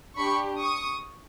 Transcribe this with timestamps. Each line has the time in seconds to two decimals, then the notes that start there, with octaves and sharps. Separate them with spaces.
0.17 D4 G4 B5 C#6
0.61 C#6 D#6